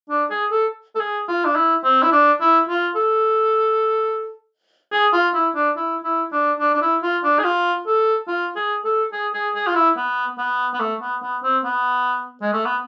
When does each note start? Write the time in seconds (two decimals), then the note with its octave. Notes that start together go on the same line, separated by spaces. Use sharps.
0.10 D4
0.31 G#4
0.51 A4
0.95 A4
1.00 G#4
1.28 F4
1.45 D4
1.56 E4
1.84 C4
2.03 E4
2.12 D4
2.41 E4
2.68 F4
2.96 A4
4.92 G#4
5.13 F4
5.34 E4
5.55 D4
5.77 E4
6.04 E4
6.32 D4
6.60 D4
6.74 D4
6.81 E4
7.03 F4
7.24 D4
7.39 G#4
7.44 F4
7.87 A4
8.28 F4
8.56 G#4
8.85 A4
9.12 G#4
9.34 G#4
9.55 G#4
9.67 F4
9.75 E4
9.97 B3
10.38 B3
10.73 B3
10.80 A3
11.01 B3
11.22 B3
11.43 C4
11.64 B3
12.42 G#3
12.53 A3
12.65 B3